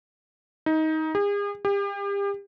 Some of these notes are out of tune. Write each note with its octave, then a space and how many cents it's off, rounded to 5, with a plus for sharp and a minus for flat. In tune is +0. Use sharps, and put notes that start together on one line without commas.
D#4 +20
G#4 -40
G4 +35